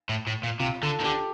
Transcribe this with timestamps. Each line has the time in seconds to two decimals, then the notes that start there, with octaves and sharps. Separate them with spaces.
0.09 A2
0.27 A2
0.43 A#2
0.59 C3 F4
0.82 D3 A4
1.00 D#3
1.04 D3 G4